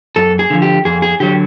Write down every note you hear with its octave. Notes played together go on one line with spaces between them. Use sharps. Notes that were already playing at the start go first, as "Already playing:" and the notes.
F#2 A4
G#4
D3 F3
G4
F2 G#4
G#4
D3 F#3 G4